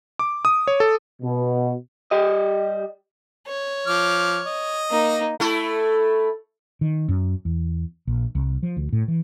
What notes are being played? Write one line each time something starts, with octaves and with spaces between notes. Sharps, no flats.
D6
D#6
C#5
A4
B2
G3 G4 D#5
C#5
F3 D6 F6
D#5
A#3 D#4
A3 E4 A4
D#3
F#2
E2
A#1
C2
F3
D2
A2
E3